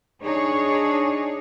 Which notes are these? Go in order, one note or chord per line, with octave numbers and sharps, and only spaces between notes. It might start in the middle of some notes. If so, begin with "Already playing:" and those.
D4 D#4 G#4 C#5